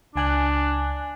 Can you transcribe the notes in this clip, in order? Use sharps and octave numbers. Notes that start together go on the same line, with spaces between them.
C#2 D4 G#5 F#6